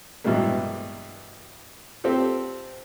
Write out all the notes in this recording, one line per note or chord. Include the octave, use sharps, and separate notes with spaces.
G2 B2 E3 F#3 G#3 A#3
C4 F4 G4 A4